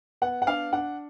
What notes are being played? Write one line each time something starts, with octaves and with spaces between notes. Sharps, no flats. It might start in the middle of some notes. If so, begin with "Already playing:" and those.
B3 F#5
F#5
D4 F5
D4 F#5